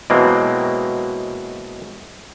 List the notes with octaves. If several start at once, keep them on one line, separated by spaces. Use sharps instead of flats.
B2 E3 F#3 G#3 A#3 C4